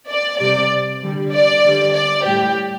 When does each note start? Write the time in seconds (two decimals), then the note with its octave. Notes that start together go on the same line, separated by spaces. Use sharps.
0.09 D5
0.40 C3 G3 D5
1.02 D3 G3
1.32 D5
1.64 D3 G3
1.94 D5
2.25 A2 G3 G4